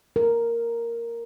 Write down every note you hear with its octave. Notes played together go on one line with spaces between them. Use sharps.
A#4